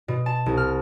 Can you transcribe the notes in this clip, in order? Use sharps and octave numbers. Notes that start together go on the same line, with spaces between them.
B2
A5
C2
F6